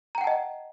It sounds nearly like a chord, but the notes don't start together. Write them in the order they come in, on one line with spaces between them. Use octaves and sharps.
A#5 G5 F#5 A5 D#5